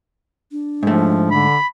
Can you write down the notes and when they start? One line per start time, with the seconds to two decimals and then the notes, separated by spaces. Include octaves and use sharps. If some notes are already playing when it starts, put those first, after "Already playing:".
0.52 D4
0.83 G#2 F3 A3
1.32 D3 B5